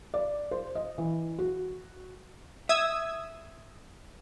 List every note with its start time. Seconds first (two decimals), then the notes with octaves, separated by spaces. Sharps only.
0.14 D5
0.51 C5
0.75 D#5
0.98 E3
1.39 F#4
2.69 E5 D#6 E6 G#6